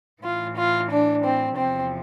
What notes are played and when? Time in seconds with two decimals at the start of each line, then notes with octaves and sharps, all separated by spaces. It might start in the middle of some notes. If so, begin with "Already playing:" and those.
0.22 A2 E3 F4
0.56 F4
0.90 D4
1.23 C4
1.56 E2 C3 F3 C4